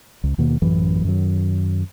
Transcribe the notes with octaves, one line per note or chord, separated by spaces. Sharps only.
C#2
D#2 B2 D#3 A#3
A1 F#2 E3 F#3
F#2 D#3 F#3